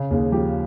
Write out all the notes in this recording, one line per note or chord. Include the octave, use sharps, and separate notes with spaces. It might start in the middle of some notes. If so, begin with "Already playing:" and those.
Already playing: C#3
D#2 G#4
F3 G4